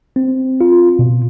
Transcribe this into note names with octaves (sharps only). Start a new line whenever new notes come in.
C4
F4
B2